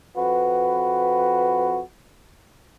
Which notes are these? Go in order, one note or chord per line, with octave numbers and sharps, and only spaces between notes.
F2 F#4 B4